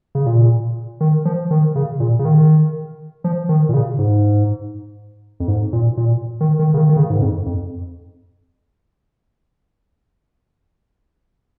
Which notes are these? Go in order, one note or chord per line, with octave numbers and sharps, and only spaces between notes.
C#3
A#2
D#3
F3
D#3
C#3
A#2
C#3
D#3
F3
D#3
A#2
C#3
G#2
F2
G#2
A#2
A#2
D#3
D#3
C#3
D#3
D#3
C#3
G#2
F2
F2